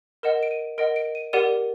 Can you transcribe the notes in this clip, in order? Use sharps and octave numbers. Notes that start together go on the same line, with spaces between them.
A#4 D#5 F#5 E7
D7
D#7
A#4 D#5 F#5 D7
D7
D#7
G4 A#4 D5 F#5 D#7